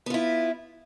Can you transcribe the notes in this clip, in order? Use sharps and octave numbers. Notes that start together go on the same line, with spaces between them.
B3 E4 F4